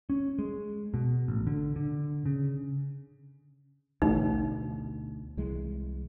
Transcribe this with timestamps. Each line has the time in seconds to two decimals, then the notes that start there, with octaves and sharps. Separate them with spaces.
0.10 C#4
0.39 G#3
0.94 B2
1.28 A1
1.47 D3
1.76 D3
2.26 C#3
4.02 A1 D2 B2 D#4
5.37 C2 E3 G#3